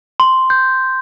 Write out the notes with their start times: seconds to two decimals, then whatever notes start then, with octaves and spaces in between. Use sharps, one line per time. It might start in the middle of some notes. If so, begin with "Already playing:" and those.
0.20 C6
0.50 G6